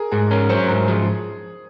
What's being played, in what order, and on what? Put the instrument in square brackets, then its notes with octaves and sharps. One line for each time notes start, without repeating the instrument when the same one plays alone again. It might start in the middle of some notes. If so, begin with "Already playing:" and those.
Already playing: [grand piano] G#4 A#4
[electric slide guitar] G#2 [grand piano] G#4
[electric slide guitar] C#4 [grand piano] A#4
[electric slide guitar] F#3 [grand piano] C5
[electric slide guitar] G#2 [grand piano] A#4
[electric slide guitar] F3 [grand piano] G#4